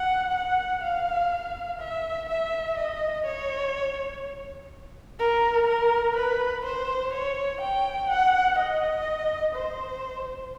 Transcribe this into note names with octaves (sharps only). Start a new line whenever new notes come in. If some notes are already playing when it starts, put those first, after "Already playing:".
Already playing: F#5
F#5
F5
E5
E5
D#5
C#5
A#4
A#4
B4
C5
C#5
G5
F#5
D#5
C5